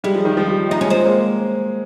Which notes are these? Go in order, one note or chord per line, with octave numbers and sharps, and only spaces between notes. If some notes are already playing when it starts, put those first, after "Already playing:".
G3 G#3
F3
D#3
F3
G3
G#3 D#4
C#4
G#3 C4
A#3